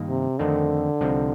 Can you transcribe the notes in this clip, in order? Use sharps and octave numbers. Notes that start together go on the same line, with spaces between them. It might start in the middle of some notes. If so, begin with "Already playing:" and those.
Already playing: G2 D#3 A#3 D#4
C3
F2 D3 D#3 A3 C4 D#4
C2 C3 F3 C4 D#4